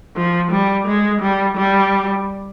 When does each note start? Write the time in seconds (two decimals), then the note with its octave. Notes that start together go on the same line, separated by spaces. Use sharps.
0.16 F3
0.51 G3
0.87 G#3
1.21 G3
1.57 G3